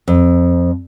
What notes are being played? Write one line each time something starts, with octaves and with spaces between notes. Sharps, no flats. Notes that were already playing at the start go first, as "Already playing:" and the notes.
F2